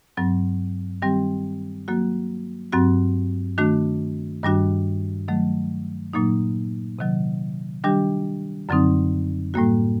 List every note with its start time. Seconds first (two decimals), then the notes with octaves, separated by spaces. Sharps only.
0.17 G2 F#3 C4
1.02 D#3 G3 C4 G4
1.88 F#3 A#3 F#4
2.72 G2 F#3 C4 F#4
3.58 D#3 A3 D4 F#4
4.43 G2 D#3 G3 D4 F#4
5.28 D#3 F#3 A3
6.13 A#2 F#3 A#3 D#4
6.99 C3 D#3 F#3
7.84 D#3 G3 D4 G4
8.69 F#2 D3 F#3 C4 D#4
9.54 A2 G3 A#3 F#4